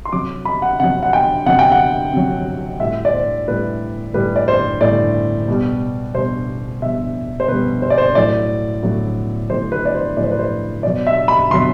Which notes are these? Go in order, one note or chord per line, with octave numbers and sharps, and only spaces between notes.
C6
C3 F#3 D6
B5
F#5
C3 F#3 F#5
F#5
G5
C3 F#3 F#5
G5
F#5
C3 F#3
A2 G3 E5
D5
C5
A2 G3 B4
A2 G3 B4
D5
C5
A2 G3 D5
B2 G3
B2 G3 C5
B2 G3 E5
C5
B2 B4
G3
C5
D5
C5
A2 F#3 D5
A2 F#3
A2 F#3 C5
B4
D5
C5
A2 F#3 D5
C5
B4
C5
B2 F#3 D5
E5
B5
B2 F#3 C6